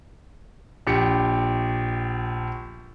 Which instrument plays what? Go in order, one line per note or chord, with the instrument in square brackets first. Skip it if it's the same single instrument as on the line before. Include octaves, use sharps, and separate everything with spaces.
[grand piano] A#1 G4 C#7